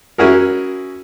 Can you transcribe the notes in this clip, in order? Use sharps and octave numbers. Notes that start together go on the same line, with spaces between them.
C#4 E4 F#4 G#4 A#4